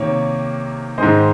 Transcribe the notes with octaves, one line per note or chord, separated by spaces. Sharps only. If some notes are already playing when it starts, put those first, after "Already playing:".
Already playing: C3 D#3 A#3 C#5
G#2 D#3 G#3 C5 D#5